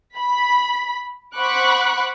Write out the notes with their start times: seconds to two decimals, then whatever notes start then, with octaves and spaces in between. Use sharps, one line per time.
0.18 B5
1.38 C5 F#5 B5 C#6 D6 F#6